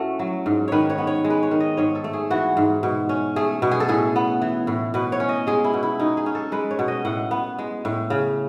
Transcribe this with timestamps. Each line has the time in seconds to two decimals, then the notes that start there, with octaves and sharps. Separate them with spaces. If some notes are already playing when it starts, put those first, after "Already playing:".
Already playing: A2 A3 C#4 F#4
0.19 F#3
0.46 G#2
0.68 D#3 B4 C#5
0.90 C#5
0.98 B3
1.07 C#5
1.24 G#3
1.30 B4
1.43 C#5
1.51 D#3
1.60 D#5
1.77 G#2 C#5
1.95 A4
2.04 A3
2.13 G#4
2.30 E3 F#4
2.57 G#2
2.83 B2
3.09 C#4
3.36 A3 G#4
3.62 B2
3.71 G#4
3.80 A4
3.89 A2 G#4
4.16 B3
4.42 E3
4.67 A2
4.94 B2 B4
5.12 C#5
5.20 C#4
5.29 D#5
5.47 G#3 G#4
5.64 E4
5.74 B2
5.83 E4
6.00 B2 D#4
6.17 G#4
6.26 C#4
6.35 A4
6.52 G#3 B4
6.71 C#5
6.79 B2
6.88 D#5
7.05 A2 F#5
7.31 B3
7.58 G#3
7.85 A2
8.10 C#3